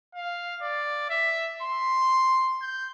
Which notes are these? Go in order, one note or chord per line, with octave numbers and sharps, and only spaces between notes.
F5
D5
E5
C6
G6